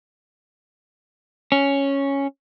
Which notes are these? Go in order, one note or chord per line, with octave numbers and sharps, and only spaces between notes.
C#4